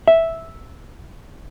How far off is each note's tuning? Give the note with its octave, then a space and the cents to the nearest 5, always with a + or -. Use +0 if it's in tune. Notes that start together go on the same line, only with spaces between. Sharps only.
E5 -5